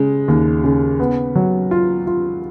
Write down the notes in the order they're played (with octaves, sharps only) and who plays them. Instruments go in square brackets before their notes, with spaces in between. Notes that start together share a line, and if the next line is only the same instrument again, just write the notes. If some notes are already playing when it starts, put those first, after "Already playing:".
Already playing: [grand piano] C#3 G#3
D#2
C#3
B3
F#3
F4
F4